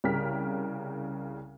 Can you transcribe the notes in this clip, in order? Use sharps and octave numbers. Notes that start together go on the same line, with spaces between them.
C2 C#3 A#4 G5 F6 B6